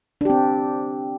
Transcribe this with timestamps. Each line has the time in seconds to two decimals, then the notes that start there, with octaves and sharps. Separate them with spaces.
0.21 D4
0.25 G4
0.30 C4